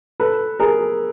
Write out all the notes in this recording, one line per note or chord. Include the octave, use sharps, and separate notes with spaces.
A4 B4
G#4 A#4